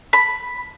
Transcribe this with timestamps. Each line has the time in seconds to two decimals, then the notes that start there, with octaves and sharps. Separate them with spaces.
0.13 B5